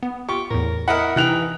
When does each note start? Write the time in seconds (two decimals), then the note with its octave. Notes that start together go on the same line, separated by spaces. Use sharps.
0.03 B3
0.29 F4 G4 C#6
0.51 E2 A2 A#4
0.88 E4 A#4 D#5 F#5
1.16 C3 E3 D#4 G5 F#6 F7